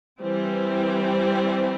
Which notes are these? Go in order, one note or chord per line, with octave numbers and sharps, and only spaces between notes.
E3 G3 C4